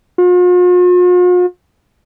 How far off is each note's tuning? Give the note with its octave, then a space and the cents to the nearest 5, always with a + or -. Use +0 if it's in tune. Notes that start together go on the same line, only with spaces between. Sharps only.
F4 +45